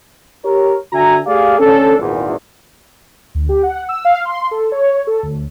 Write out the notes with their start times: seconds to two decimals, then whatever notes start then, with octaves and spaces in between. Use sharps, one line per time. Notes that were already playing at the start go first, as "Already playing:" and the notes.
0.45 G4 A#4 C#5
0.93 D3 F#4 E5 G#5 A#5
1.25 A3 G4 G#4 D5 F5
1.59 D2 C#4 D4 A4
1.99 G#1 E2 A#2
3.35 D2
3.49 G4
3.63 F#5
3.89 E6
4.05 F5
4.25 C6
4.51 A4
4.72 C#5
5.07 A4
5.23 D2